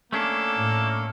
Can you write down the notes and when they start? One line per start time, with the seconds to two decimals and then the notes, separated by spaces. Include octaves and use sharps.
0.13 A3 A#3 C#4 D4 A4
0.55 A2